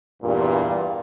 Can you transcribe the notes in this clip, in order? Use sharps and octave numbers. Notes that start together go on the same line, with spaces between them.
E2 G2 A#2